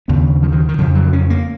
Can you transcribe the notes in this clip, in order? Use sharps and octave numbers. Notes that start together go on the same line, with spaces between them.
D#2 C#3 B3
F3
D#3
D#3
F2 C#3 F3
F#3
C#4
A#3